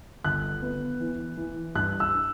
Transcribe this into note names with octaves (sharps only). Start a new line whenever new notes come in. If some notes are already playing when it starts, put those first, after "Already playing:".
G1 F#6
B3
E3
E3
G2 F#6
E6